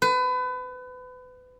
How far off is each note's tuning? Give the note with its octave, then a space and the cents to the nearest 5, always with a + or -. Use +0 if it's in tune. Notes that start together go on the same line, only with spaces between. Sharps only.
B4 +30